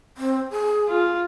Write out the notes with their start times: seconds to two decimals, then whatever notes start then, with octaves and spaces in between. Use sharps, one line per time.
0.17 C4
0.51 G#4
0.88 F4